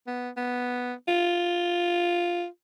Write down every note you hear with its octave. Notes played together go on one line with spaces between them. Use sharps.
B3
B3
F4